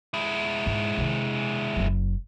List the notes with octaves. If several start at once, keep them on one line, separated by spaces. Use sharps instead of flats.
G#3 E4
G#2
C3 D#3
F#1 F#3